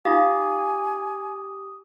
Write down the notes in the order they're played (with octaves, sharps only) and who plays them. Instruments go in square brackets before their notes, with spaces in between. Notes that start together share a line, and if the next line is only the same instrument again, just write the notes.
[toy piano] D#4 F4 F5 [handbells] G4 [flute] G#5 [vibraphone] D#6